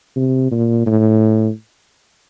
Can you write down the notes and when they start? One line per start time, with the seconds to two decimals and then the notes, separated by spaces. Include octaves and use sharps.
0.16 C3
0.51 A#2
0.86 A2